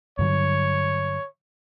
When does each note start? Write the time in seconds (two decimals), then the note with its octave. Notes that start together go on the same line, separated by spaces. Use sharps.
0.19 G2 D3 F#3 C#5